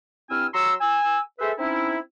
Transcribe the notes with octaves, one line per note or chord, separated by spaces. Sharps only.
G2 C4 E4 G#5 E6 F6
F#3 A#5 C6 C#6 E6
G#5 E6
G#4 A4 B4 C5 E5
C4 C#4 D#4 E4